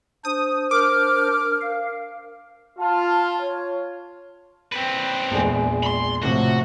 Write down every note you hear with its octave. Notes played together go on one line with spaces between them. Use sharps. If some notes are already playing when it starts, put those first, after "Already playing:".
D4 C5 D#6
A#4 D6 F6
F5
F4 A5 F6
C#5
C4 B4
A#1 E2 G#3
B5 C6
A2 C3 F3 F#4